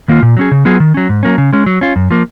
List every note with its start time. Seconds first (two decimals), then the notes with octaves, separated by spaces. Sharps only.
0.08 D#3 A#3 F4
0.23 A#2
0.37 F#3 C#4 G#4
0.51 C#3
0.65 F#3 B3 F4 G#4
0.80 D#3
0.94 F#3 C#4
1.09 G#2
1.23 F#3 A#3 C#4
1.38 C#3
1.53 G#3 C#4
1.66 F#3
1.81 C#4 F4
1.96 F#2
2.11 F3 A#3